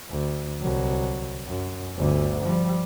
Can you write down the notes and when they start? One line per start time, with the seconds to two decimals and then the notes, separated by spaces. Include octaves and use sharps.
0.10 D2
0.60 C2 F#3
1.47 F#2
1.96 G1 D2
2.44 F3 G3